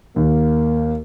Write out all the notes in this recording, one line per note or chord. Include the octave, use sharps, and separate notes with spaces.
D#2 A#3